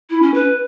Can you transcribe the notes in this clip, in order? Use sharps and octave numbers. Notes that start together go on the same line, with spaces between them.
E4
C#4
B4